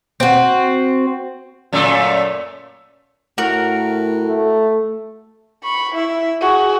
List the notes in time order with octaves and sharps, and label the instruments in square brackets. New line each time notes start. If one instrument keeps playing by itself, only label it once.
[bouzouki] C4 F#4
[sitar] F#2 A#2 A3
[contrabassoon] A2 [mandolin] F#4 A#4
[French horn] A3
[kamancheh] B5 C#6
E4 E5
F#4 G#4